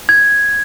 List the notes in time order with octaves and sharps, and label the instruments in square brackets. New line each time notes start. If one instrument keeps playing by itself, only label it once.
[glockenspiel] G#6